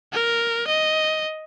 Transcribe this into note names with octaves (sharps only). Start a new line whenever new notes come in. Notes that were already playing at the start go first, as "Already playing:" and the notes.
A#4
D#5